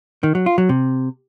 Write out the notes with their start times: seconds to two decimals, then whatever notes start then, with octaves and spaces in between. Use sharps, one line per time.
0.23 D#3
0.35 F#3
0.46 F4
0.58 F#3
0.69 C3